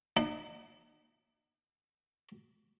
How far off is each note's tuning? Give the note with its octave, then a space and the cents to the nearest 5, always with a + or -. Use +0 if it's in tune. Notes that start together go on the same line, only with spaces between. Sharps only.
D#4 -45